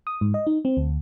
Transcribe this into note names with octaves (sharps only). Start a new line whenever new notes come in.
D#6
G#2
D#5
D#4
C4
D2